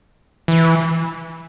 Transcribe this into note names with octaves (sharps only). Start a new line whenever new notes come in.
E3